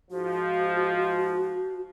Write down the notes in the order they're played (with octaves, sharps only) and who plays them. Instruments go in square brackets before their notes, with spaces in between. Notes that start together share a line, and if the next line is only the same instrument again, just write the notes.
[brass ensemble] G#2 F3 [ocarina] F#4